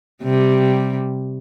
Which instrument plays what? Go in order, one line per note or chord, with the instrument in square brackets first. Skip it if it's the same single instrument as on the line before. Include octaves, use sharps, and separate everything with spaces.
[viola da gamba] C3 G3